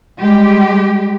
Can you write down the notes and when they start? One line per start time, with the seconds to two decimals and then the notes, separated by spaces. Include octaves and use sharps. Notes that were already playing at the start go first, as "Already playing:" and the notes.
0.19 G3 G#3 G4